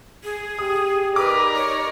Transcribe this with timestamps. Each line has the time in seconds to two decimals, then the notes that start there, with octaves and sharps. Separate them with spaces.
0.24 G#4
0.59 G4 D#6
1.16 D#4 A#4 B4 D5 D6
1.56 C#5